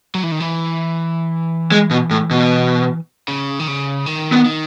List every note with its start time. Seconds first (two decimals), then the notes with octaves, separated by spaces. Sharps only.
0.15 F#3
0.23 E3
0.32 D#3
0.40 E3
1.72 G#3
1.91 B2
2.11 A2
2.31 B2
3.28 C#3
3.60 D#3
3.68 C#3
4.06 D#3
4.32 B3
4.45 D#3